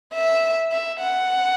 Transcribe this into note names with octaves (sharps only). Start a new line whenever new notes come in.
E5
E5
F#5